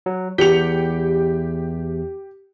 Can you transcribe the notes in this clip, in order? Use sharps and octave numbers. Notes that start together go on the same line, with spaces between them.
F#3
E2 G4 G6 B6 C#7 F7